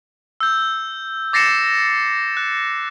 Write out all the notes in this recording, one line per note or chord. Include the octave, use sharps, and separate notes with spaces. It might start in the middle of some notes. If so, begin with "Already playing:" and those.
E6 G6
D6 A6 A#6 C7 C#7 E7
F#6